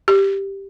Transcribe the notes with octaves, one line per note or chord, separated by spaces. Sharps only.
G4